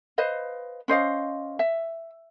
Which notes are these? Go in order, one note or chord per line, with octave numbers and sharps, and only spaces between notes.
B4 C5 D#5 F5
C#4 C5 D#5 F5
E5